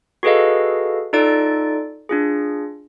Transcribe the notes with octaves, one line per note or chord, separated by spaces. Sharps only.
F#4 G#4 A4 B4 D#5 F5
D#4 F4 A4 D5 D7
D4 F4 G#4